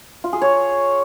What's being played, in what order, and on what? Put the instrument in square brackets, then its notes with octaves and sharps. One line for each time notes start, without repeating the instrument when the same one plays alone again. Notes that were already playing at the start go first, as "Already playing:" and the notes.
[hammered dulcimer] F4
G#4
C#5